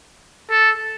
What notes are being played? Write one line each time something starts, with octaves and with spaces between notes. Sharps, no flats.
A4